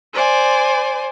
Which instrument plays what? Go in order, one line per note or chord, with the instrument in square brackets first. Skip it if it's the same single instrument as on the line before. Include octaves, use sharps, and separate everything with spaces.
[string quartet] C5 D5 G#5